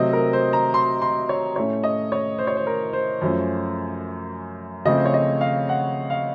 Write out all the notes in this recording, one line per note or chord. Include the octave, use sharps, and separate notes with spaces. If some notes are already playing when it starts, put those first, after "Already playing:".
Already playing: C3 F#3 A3 C4 D#5
A#4
C5
A#5
C6
C6
C#5
A2 A3 C#4 C#5
D#5
C#5
C5
C#5
C5
A#4
C5
F#2 F3 A3 C#4
C#3 F3 A3 C4 D#5
C5
C#5
D#5
F5
F#5
F5